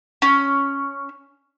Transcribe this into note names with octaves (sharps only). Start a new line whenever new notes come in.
C#4